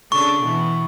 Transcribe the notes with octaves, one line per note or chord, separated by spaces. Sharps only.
C#3 D4 A4 C#6
B2 E3 B3